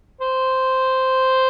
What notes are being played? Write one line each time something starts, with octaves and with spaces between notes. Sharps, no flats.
C5